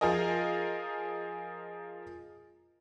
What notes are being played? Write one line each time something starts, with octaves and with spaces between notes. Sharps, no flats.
F3 F4 G#4 A#4 D#5